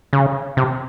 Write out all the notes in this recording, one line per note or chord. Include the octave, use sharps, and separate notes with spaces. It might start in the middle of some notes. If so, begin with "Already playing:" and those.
C#3
C3